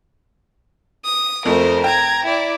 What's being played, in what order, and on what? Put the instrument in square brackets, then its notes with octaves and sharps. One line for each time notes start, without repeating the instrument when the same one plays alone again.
[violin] D#6
[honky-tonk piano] F2 A3 [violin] A#4 C5
[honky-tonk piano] G5 [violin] A#5 G#6
[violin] E4 D5